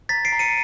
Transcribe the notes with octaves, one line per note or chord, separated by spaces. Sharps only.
A#5 A6 B6
C7 D7
A#5
C#7 D#7